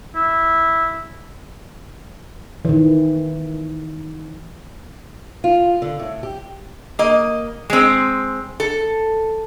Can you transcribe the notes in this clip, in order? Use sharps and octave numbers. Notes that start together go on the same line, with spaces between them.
E4
D#3 E3
F4
D3
A2
G4
A#3 D#5
G#3 C4
A4